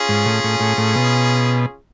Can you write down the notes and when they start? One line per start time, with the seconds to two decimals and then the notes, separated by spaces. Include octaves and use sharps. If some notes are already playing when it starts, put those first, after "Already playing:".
Already playing: C#4 F4 G#4
0.09 G#2
0.26 A2
0.44 A2
0.60 A2
0.77 A2
0.95 B2